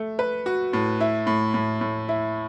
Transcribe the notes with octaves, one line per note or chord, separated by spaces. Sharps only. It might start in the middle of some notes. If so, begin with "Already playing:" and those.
Already playing: A3
B4
F#4
A2
E4
A2
A2
A2
E4